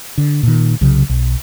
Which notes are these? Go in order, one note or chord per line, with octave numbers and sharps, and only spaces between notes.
D3
A#2 D#3
C2 C#3 F#3
B1